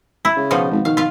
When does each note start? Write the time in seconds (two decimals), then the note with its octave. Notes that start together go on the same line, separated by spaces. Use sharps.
0.25 E4
0.36 C#3
0.51 B2 F3 D#4
0.71 G#1
0.85 D#3 F5
0.97 F4 F5